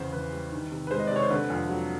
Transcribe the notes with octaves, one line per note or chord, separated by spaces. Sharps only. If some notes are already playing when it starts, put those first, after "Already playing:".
Already playing: E2 C#3 C5
E3 B4
G3
D#3
C3
B4
G#3 C5
D#5
D5
C3 C#5
C5
D3 B4
F2
F#3